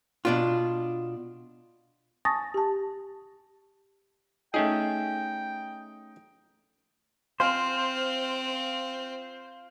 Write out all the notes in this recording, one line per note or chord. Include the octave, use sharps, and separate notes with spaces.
B2 D4 F4
G#5 A5 C#6 D#6 A6 A#6
G4 A5
A3 C#4 D#4 G#4 G5
C4 F4 C5 G#5